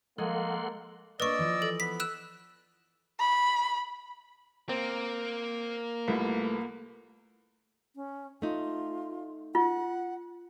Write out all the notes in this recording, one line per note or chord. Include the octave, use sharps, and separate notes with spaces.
F3 G#3 A#3 A4 F#5 C6
A3 A#3 D4 B4 D5 D#5 C#6 E6
E3 F3
A4
B3 B6
E6 F#6 E7
B5
A#3 C4
C2 A3 E4 F4 A4 B4
C#4
A3 D#4 F4
F4 F#5